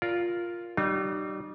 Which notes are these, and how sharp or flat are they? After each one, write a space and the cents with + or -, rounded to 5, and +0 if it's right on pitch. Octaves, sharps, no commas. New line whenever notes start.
F4 +0 A#4 +0 D5 -20
G3 -30 D#4 -45